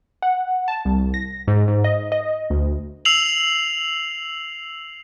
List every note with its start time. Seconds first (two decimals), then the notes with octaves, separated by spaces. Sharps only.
0.22 F#5
0.68 A5
0.85 C2
1.14 A#6
1.48 G#2
1.68 G#2
1.84 D#5
2.12 D#5
2.50 D2
3.05 E6 C7 F7 F#7